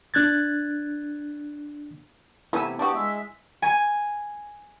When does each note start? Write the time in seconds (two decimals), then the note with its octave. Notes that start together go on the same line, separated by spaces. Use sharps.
0.14 D4 F#6 G#6 A6
2.53 C3 A3 B3 E4 G#5 E6
2.79 B3 D4 F#4 G4 D6
2.94 G#3 E5
3.62 G#5